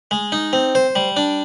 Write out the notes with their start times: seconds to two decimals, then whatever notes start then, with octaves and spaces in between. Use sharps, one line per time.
0.11 G#3
0.32 D#4
0.53 C4
0.75 C5
0.96 G3
1.17 D4